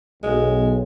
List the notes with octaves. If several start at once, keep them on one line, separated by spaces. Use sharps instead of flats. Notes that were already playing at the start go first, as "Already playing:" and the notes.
B1 G#3